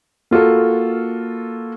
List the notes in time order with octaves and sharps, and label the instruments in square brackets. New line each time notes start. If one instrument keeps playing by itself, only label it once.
[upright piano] A#3 F4 F#4 A4